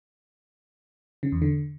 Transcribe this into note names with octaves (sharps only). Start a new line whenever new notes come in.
C#3
E2
D3